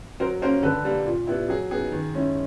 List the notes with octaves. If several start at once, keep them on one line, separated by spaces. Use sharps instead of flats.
F#3 A#4 C5
A#3 C#4 A#4 C5
D3 A4 B4
G3 A#3
A#2
G3 B3 E4
F#3 G#4
B3 D#4 G#4
D#3
G#3 C#4 E4